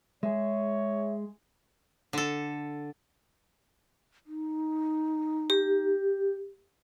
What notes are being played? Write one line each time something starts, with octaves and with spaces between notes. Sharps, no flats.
G#3 G#4 C#5 E5
D3 A4
D#4
G4